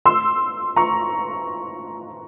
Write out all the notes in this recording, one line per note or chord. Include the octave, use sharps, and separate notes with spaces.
C6 E6
A#5 C#6